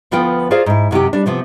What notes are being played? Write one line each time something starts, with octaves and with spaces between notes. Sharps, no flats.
D2 F3 B3 F4 B4 G5
F4 G#4 A#4 C5 D5 F5
G#2 E4
F#2 C3 D#3 G4
G3 D4
C3 F3 B3